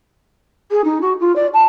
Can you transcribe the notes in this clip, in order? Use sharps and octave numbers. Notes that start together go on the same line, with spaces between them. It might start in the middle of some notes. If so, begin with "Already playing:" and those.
G#4
D#4
F#4
F4
D5
A5